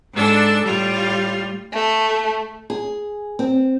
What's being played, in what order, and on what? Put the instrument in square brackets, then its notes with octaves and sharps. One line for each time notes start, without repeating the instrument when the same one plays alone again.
[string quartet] G#2 D4 A4 E6
A2 G3 F4
[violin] A3
[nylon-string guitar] G#4
C4